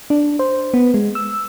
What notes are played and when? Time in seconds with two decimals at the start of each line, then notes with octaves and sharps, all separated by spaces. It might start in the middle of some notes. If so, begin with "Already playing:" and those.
0.10 D4
0.39 C5
0.74 B3
0.94 G#3
1.15 E6